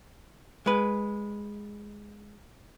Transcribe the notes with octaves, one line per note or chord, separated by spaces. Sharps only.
G#3 B4